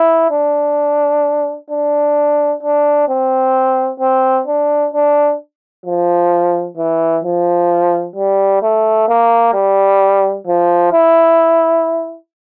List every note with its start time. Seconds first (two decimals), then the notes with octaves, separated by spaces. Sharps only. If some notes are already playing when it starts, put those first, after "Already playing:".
Already playing: E4
0.31 D4
1.70 D4
2.63 D4
3.09 C4
4.00 C4
4.47 D4
4.93 D4
5.86 F3
6.77 E3
7.24 F3
8.16 G3
8.62 A3
9.08 A#3
9.54 G3
10.47 F3
10.93 E4